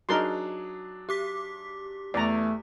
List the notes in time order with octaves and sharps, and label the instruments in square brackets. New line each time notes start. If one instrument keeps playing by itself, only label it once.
[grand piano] F#3 D4 G#4 [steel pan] D#4 A#4 C6
[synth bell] G4 D6 B6
[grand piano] E2 [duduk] A3 [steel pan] D5 A#5